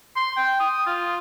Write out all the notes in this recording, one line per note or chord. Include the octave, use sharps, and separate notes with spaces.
C6
G5
D#6
F4